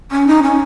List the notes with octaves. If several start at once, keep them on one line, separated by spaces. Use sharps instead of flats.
C#4
D#4
C#4